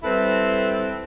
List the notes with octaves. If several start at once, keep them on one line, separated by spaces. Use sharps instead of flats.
G3 C4 E4 A4 B4